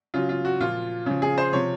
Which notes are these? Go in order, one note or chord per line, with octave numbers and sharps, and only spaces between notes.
C#3 F#3 F4
F4
F#4
A#2 F3 F4
C#3 F3
G#4
C5
C3 F3 C#5